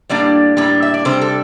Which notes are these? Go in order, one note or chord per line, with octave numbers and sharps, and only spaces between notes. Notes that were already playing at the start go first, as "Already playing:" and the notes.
A2 G3 A#3 D4 D5
A2 G3 A#3 D4
E5
D5
C3 G3 D4 C5
A4